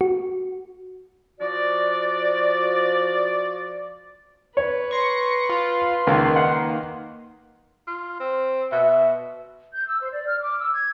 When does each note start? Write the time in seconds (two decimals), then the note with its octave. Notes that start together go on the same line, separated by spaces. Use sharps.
0.01 F#4
1.40 F3 F#4 D5
4.57 B4 C#5
4.91 C6 C#6 A#6 C#7
5.49 F4
6.07 C#2 D#3 A#3
6.36 F#5
7.87 F4
8.20 C4
8.72 B2 E5
9.74 G6
9.87 E6
10.00 C5
10.12 D5
10.26 F6
10.40 D6
10.60 E6
10.73 G#6